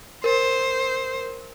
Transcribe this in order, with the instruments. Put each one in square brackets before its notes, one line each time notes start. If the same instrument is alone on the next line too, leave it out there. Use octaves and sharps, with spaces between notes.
[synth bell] A#4 [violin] C5